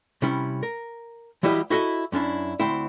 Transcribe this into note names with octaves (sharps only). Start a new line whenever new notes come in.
C3 G3 C#4 E4
A#4
E3 F#3 G3 E4 G4 D#5
E4 F#4 A4 C5 D#5 E5
F#2 C#4 D4 E4
D2 C4 E4